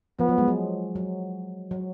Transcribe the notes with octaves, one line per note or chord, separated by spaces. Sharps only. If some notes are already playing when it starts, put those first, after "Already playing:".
F3 B3
F#3
G#3
F#3
F#3
F#3